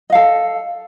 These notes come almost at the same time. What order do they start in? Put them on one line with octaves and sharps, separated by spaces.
D#5 F5 A4